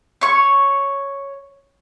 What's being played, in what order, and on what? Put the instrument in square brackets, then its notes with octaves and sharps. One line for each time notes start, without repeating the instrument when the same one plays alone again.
[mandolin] C#5 C#6